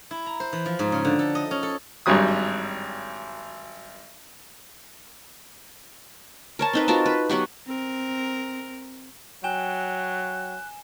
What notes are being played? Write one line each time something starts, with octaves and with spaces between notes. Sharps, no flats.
E4
A#5
C5
E3
F3
G#2
C#3
D3
A4
D#5
C#4
A4
G#1 G2 F#3 G3 D#6
A#4 C#5 A5
C4 D#4 B4
F4 F#4 A#4 A5
B4
F#3 B3 F#4 G4
C4 A#4
F#3 G5 G#5 F#6 E7 G7